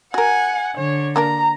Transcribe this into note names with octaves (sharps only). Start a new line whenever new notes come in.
F#4 A#4 F#5 G#5
D3 C#5
A#3 D4 A#4 A#5